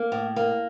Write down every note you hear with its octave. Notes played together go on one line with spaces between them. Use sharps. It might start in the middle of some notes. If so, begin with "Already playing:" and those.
Already playing: A#3
A2
A#3